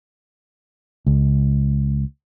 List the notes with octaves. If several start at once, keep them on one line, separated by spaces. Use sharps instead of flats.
C#2